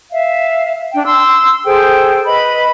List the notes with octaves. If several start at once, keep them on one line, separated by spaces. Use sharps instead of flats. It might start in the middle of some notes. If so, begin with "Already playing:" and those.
E5 F5
D4 G5
C6 E6
G#4 A4 C5 G5
B4 D#5 B5